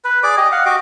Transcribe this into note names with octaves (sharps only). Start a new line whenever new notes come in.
B4
G#4 D5 D6
G4 D#5
F5 F#5
F#4 G4 D#5 D6